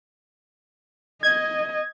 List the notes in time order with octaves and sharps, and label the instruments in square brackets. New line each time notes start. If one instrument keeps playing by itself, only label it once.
[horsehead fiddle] D#5 [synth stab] G#6